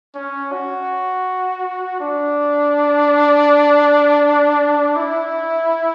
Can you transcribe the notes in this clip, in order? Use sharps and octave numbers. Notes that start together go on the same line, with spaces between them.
C#4
F#4
D4
E4